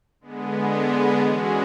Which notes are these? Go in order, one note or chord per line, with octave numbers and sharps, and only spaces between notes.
D3 G#3 B3
E3 G#3 C#4 F#4